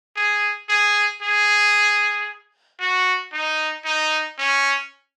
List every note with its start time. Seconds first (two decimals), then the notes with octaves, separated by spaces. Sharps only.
0.16 G#4
0.69 G#4
1.22 G#4
2.80 F#4
3.33 D#4
3.85 D#4
4.38 C#4